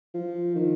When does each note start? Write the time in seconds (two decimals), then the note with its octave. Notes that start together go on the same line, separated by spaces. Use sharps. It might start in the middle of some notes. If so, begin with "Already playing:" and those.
0.14 F3
0.55 D#3